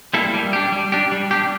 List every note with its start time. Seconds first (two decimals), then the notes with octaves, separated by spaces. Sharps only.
0.13 G3 A#3 E4 A4
0.34 G3
0.53 D4 G4
0.72 G3
0.92 D4 G4
1.12 G3
1.31 D4 G4